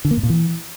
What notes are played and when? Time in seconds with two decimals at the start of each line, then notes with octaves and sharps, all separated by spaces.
0.05 D3
0.11 A#3
0.17 G#2
0.23 A#2
0.30 E3